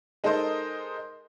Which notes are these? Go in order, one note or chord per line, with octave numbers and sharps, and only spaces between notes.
G#3 D#4 A4 A#4 C5 D#5